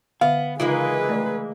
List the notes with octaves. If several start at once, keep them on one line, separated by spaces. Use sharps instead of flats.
D3 B3 E5 F5
C#3 E3 G#3 A#3 D#4 F4 G#4 B4
A3 D5